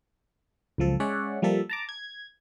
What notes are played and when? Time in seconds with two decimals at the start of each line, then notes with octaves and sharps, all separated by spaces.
0.78 C#2 F#2 F3 A4
1.00 G#3 C#4 C#5 D5 E5 F#5
1.42 F3 G3 A#3 A4 E5
1.69 A5 A#5 D6
1.89 G#6